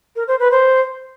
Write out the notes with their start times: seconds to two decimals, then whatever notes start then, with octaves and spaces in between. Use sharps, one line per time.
0.16 A#4
0.28 C5
0.39 B4
0.51 C5